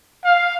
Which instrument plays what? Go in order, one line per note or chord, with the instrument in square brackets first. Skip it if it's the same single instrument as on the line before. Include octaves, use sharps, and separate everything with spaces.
[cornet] F5